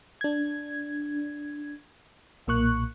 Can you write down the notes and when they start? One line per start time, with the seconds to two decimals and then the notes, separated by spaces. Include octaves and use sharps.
0.21 D4 G#6
2.47 B1 A#2 A#3 C#6 F#6